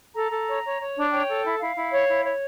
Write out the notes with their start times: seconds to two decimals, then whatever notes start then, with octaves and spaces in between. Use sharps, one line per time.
0.15 A4 A#5
0.31 A4
0.47 C#5
0.64 C#5
0.79 C#5
0.95 D4
1.11 C#5 G5
1.27 A4
1.44 E4
1.60 E4 F5
1.76 E4
1.92 C#5
2.08 E4
2.24 C#5